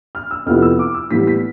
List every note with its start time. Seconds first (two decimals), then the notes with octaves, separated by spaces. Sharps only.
0.15 F6
0.31 E6
0.46 F2 C3 F3 B3 E4 F6
0.62 E6
0.79 D6
0.94 E6
1.10 A2 E3 G3 B3 B6
1.27 B6